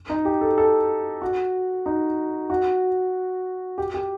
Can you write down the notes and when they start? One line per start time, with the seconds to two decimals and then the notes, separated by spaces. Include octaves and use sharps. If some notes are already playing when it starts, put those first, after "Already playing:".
0.10 D#4
0.25 G4
0.41 A4
0.58 A4
1.22 F#4
1.86 D#4
2.50 F#4
3.78 G4
3.94 G4